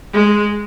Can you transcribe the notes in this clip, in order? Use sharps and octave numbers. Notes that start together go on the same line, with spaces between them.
G#3